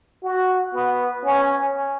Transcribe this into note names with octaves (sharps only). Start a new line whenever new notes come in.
F#4
B3
C#4